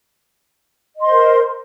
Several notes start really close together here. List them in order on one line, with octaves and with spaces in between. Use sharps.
D#5 C6 C5 A#4